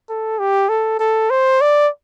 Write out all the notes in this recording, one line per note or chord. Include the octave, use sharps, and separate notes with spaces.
A4
G4
A4
A4
C5
D5